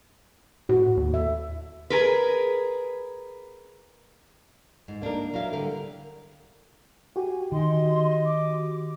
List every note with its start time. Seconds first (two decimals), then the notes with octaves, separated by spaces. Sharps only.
0.69 A2 F#4
0.97 D#2
1.14 E5
1.90 G#4 A#4 B4
4.88 G#2
5.02 A#3 D4 D#4 A#4
5.33 F#3 E4 A#4 F5
5.53 D3 G3 A#4
7.16 F#4 G4 G#5
7.52 D#3 D#5 C6
8.25 D6